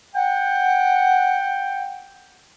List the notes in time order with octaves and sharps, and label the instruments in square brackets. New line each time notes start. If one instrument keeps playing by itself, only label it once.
[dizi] F#5 [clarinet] G5